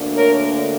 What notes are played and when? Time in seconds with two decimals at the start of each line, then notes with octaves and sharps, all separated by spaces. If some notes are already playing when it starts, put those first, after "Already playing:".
Already playing: D2 D3 A#3
0.16 A#4 C#5